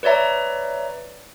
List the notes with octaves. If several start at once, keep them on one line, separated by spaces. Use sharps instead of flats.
B4 C#5 D5 E5 A#5